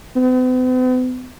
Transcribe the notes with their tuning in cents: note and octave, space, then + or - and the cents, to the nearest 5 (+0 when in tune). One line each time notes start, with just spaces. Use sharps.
B3 +45